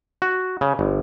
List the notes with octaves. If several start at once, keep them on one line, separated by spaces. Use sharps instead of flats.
F#4
C#3
G1